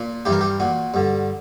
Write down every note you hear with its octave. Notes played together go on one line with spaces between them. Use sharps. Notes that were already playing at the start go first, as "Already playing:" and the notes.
Already playing: A#2
G2 E3 G4
A#4
G4
A#2 F#4
G2 D3